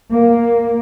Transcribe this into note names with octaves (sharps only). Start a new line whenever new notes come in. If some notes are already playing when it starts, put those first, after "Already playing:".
A#3